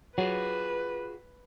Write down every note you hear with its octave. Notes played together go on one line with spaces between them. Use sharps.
F#3 F4 F#4 G#4 B4